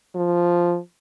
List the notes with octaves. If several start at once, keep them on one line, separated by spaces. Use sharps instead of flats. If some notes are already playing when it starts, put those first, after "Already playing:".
F3